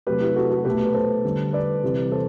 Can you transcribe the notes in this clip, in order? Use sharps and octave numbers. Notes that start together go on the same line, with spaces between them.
C3 F#3 A3 G4 B4
E4 G4
F#4 A4
F#4 A4
B2 A3 G4 B4
B4
A4 C5
D3 G3
B4 D5
C3 E3 G3
A4 C5